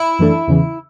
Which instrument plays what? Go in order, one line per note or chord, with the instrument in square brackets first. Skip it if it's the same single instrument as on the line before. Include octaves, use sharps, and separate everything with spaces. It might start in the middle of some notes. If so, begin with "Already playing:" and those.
Already playing: [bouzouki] E4
[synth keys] F#2 E3 A3 D4 A4
E2 C#3 E3